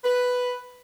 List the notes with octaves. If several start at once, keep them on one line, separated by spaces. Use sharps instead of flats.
B4